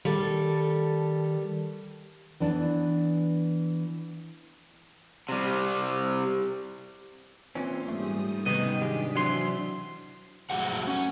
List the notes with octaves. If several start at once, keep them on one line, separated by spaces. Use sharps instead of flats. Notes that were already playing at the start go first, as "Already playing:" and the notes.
D#3 G3 A4
E3 B3 D4
C3 G3
A#2 E3 C4 C#4 C6
G#2 G3 A3 D#6
F#2 C3 D#3 B3 D#5
G#3 D4 G4 B6
E3 F#3 C4 C6
F#3 A3 G#4 F#5
C#4